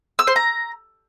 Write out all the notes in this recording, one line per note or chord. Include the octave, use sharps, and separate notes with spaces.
E6
C5
A#5